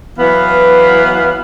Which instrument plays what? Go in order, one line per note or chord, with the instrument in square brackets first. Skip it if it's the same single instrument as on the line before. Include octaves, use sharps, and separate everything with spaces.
[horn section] E3 F#3 B3 B4 F5 F#5